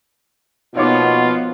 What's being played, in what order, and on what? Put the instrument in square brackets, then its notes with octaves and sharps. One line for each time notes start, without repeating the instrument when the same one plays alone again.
[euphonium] B2 [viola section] F3 A#3 B3 [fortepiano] D#4 C#5 D6 [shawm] F4